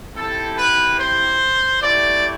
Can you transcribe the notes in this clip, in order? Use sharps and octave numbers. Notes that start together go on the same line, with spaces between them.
C4 E4 G4 A4
B4
C5
A3 E4 G4 D5